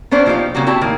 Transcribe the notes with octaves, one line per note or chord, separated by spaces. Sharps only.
B3 C#4 D4 C5
A#2 F3 G3 D#4 G4 F5
C#3 G3 A#3 F#4
E4 F#4 G4 A5
A2 D#3 A#3